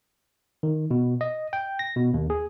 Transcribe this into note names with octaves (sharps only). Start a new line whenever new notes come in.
D#3
B2
D#5
G5
A#6
B2
D#2
G#4